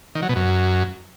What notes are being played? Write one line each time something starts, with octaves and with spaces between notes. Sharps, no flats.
D#3
F#3
B2
F#2